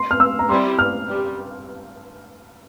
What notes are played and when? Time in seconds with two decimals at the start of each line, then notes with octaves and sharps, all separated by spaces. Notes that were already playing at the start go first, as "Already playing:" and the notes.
Already playing: C6
0.11 F6
0.20 E6
0.39 A#5
0.49 G3 C4 E4 C6
0.79 F6
1.08 G3